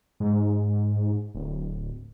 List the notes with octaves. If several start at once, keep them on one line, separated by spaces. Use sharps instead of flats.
G#2
D1